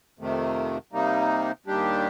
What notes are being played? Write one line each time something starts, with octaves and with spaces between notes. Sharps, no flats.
F2 C3 D#3 A3
C3 G3 A#3 D#4
D#2 D#3 G3 D4 G4